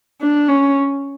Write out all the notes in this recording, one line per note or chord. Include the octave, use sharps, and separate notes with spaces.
D4
C#4